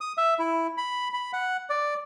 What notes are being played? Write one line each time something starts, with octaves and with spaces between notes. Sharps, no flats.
D#6
E5
E4
B5
B5
F#5
D5